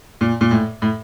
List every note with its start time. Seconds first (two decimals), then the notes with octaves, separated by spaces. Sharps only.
0.21 A#2
0.41 A#2
0.51 A2
0.82 A2